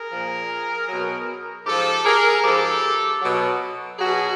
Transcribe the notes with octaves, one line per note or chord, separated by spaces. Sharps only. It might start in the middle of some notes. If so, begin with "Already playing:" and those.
Already playing: G#4 A#4
A#2 F3
B2 F#3
G#2 F3 G4 A4
G#4 A#4
G#2 F3 G4 A4
B2 F#3
B2 F#3 F#4 G#4